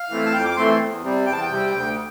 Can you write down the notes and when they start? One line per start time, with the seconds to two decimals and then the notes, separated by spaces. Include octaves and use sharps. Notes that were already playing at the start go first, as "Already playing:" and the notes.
Already playing: F5
0.10 E3 A3 C4
0.26 A5
0.33 F2 G5
0.44 D6
0.56 E3 A3 C4 C6
0.79 E2
1.03 C3 G3 C4
1.26 E2 G5
1.33 A5
1.41 G5
1.49 C3 G3 C4
1.73 D2 G5